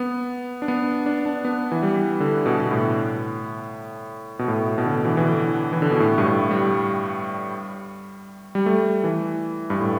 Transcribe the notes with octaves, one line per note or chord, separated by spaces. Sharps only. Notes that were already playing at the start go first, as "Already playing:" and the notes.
Already playing: B3
D4
B3
D4
D4
B3
E3
G3
D3
B2
B2
A2
B2
A2
B2
D3
E3
E3
D3
E3
D3
B2
A2
G2
A2
G3
G3
A3
E3
G2
A2